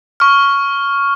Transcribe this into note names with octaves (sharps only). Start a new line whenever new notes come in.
C#6 F6